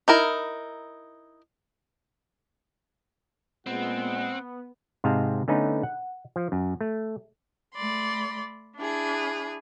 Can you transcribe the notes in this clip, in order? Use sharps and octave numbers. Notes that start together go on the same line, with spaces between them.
D#4 E4 A#4
A#2 G#3 B3 C4 F#5
G#2 C3 C4 D#5 F5 A5
D3 A3 B3 C#4 D#4 B4
F#5
F3
F#2
A3
A3 D5 B5 C6
D4 E4 G#4